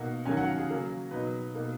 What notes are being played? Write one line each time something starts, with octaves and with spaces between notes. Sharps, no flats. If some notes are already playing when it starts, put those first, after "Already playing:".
Already playing: B2 A#3 D#4 F#5
D#3 F#3 C#4 G#5
F#5
F5
G#4
C#3 F#3 A#3
B2 F#3 B3 D#4 B4
B2 A#3 D#4